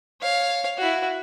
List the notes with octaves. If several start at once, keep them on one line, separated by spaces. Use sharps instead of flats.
C#5 F5
E4 F#4